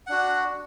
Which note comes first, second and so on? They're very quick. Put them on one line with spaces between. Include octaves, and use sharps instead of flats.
F#5 D4 F#4